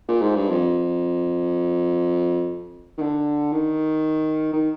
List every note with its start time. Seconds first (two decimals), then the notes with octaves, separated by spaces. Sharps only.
0.09 A#2
0.22 G#2
0.35 G2
0.50 F2
2.98 D#3
3.01 D3
3.53 D#3
4.53 D#3